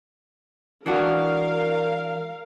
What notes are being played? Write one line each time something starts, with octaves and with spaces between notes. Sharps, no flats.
E3 D4 F#4 A#4 F5